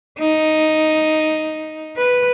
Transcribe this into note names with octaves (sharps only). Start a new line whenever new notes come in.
D#4
B4